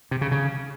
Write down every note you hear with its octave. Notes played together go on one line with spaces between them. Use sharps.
C3
C#3
C#3